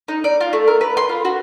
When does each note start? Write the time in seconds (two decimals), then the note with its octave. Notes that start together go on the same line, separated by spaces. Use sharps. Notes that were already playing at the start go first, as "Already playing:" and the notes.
0.08 D#4
0.24 D5
0.41 F4
0.53 A3
0.67 A#4
0.81 B4
0.97 C6
1.09 F4
1.25 F#4